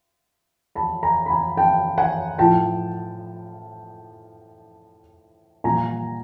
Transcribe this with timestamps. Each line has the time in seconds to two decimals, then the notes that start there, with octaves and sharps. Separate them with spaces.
0.75 A5 B5
1.03 G#5 A#5
1.26 B5
1.30 G#5 A#5
1.57 G5 A5
1.98 F#5 G#5
2.38 A2 F3 G5 A5
5.64 A#2 G3 G#5 A#5